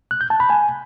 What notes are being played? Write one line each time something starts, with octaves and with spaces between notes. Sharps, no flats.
F#6
G6
A5
B5
G#5